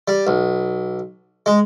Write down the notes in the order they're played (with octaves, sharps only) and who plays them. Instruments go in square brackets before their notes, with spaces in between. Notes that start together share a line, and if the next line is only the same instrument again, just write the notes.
[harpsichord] G3
B1
G#3